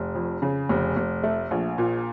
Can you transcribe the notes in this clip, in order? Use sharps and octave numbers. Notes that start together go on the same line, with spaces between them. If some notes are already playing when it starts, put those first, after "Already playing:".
Already playing: F1
F2
C#3
F1
F1
A3
A#1
A#2